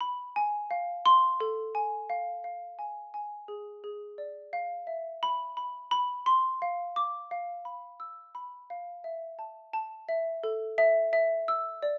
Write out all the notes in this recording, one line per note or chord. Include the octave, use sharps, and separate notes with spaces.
B5
G#5
F5
C6
A4
G#5
F5
F5
G#5
G#5
G#4
G#4
D5
F5
E5
B5
B5
B5
C6
F5
D6
F5
B5
E6
B5
F5
E5
A5
A5
E5
A4
E5
E5
E6
D5